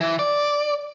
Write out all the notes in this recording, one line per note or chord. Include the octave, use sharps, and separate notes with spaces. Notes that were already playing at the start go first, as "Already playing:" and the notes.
E3
D5